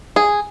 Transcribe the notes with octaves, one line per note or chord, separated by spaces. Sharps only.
G#4